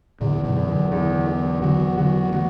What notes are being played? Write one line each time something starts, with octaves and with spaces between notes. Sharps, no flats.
E2 A2 D3
F#2 B2
E2
D3 F#3
E2 D3 F#3
E2
D3 F#3 F#4
D3 F#3 F#4
E3 A3 F#4